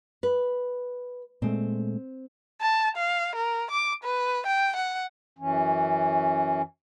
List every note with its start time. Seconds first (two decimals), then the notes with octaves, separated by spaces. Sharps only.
0.23 B4
1.42 A#2 G#3 A3 C4
2.61 A5
2.96 F5
3.35 A#4
3.71 D6
4.04 B4
4.46 G5
4.75 F#5
5.39 F#2 E3 C#4